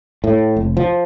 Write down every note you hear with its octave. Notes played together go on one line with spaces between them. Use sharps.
A2
F1
F3